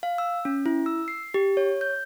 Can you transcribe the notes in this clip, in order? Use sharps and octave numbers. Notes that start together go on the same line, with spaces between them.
F5
E6
C#4
E4
E6
C7
G4
C#5
G6